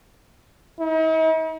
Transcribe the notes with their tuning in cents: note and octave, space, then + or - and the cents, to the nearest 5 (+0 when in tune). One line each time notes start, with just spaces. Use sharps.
D#4 +45